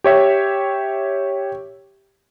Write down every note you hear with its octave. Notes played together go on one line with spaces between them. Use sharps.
G4 C#5 E5